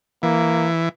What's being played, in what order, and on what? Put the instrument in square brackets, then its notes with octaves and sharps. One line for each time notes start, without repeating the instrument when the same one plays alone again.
[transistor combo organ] E3 [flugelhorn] A#3